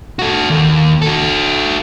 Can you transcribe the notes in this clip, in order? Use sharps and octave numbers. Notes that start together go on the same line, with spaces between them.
F#4 A4
D#2
F#4 A4